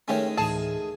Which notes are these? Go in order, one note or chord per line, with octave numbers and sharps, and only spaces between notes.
D#3 G#3 A3 C#4 G4 C#5
D2 A2 E3 G#4 A5